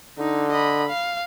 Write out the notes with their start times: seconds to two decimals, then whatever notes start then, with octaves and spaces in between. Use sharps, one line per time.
0.19 D3 D#4
0.51 D#5 B5
0.88 F5